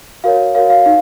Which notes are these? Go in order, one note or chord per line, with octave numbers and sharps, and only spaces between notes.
F#4 A#4 C#5 F5
F#4 A#4 C#5 F5
F5
D#4 F5